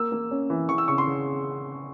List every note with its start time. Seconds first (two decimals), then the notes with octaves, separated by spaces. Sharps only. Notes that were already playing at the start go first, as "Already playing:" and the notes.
Already playing: A#3 E6
0.12 A#3
0.31 C#4
0.50 E3
0.69 E3 C#6
0.78 E6
0.88 C#3 C#6
0.98 C6
1.07 C#3